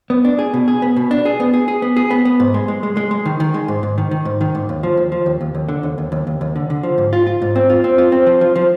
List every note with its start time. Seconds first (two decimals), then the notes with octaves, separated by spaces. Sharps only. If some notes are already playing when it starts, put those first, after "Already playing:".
0.10 B3
0.25 D4
0.39 G#4
0.54 B2
0.68 G#4
0.82 B3
0.96 B2
1.11 D4
1.25 G#4
1.40 B3
1.53 G#4
1.68 G#4
1.82 B3
1.96 G#4
2.10 B3
2.25 B3
2.40 G#2
2.54 G#3
2.68 G#3
2.83 G#3
2.97 G#3
3.11 G#3
3.26 D#3
3.40 D#3
3.54 G#3
3.68 G#2
3.83 G#2
3.98 D#3
4.11 D#3
4.25 G#2
4.41 D#3
4.55 G#2
4.69 D#2
4.83 F3
4.97 D#2
5.12 F3
5.26 D#2
5.41 D#2
5.55 D#2
5.68 D3
5.83 D#2
5.98 D#2
6.12 D#2
6.27 D#2
6.41 D#2
6.56 D3
6.70 D3
6.83 F3
6.98 G#2
7.13 F4
7.27 F4
7.42 G#2
7.56 C4
7.70 F4
7.84 C4
7.98 F4
8.12 C4
8.26 F3
8.41 F3
8.56 F3